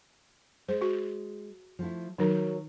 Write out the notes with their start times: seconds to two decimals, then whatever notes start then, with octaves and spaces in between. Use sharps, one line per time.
0.68 G#3 C5
0.81 F#4
1.79 F3 A3 E4
2.18 D#3 F#3 D#4 A#4